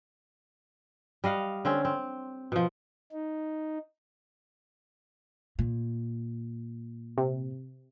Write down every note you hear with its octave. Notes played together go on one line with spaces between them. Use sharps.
G3 D#5 F5 F#5
D3 C4 C#4
C4
B2 F3
D#4
A#2
C3